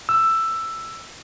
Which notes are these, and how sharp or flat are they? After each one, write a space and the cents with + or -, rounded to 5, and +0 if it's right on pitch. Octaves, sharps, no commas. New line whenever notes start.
E6 +10